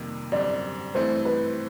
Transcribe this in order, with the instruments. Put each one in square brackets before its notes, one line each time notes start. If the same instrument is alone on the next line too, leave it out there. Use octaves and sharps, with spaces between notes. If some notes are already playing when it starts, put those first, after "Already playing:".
Already playing: [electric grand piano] F2 C3 D#3 G3 A#3
[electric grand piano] F#2 D3 G3 C4 [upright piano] D5
[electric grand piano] G2 E3 A3 C4 [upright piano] C5
[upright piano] B4